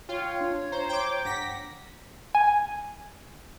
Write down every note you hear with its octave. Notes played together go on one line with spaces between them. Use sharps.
F4 C#5 G5
D4
C5 A#5
G5 D6
G2 F#5 A#6 B6
G#5